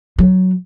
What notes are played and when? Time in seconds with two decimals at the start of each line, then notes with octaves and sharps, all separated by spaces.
0.19 F#3